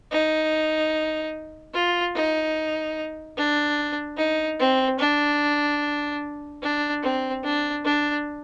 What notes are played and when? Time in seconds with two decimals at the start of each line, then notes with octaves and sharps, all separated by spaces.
0.11 D#4
1.74 F4
2.15 D#4
3.37 D4
4.17 D#4
4.59 C4
4.99 D4
6.62 D4
7.03 C4
7.43 D4
7.85 D4